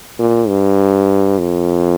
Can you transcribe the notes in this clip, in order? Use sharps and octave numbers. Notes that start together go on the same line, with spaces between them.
A#2
G2
F2